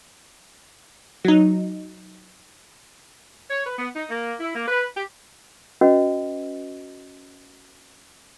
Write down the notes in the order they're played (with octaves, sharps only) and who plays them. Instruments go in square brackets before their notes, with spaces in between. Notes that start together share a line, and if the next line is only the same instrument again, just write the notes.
[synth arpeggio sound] F#3 D#4
[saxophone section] C#5
B4
B3
D#4
A#3
E4
A#3
B4
G4
[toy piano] C#4 F#4 B4 D#5